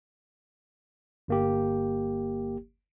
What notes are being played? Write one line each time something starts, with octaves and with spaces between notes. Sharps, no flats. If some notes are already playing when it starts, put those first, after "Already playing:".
G1 A#3 G4